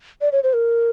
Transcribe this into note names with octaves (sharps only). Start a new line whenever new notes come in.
D5
C#5
C5
A#4